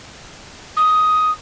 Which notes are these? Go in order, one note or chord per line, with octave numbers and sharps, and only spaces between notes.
D#6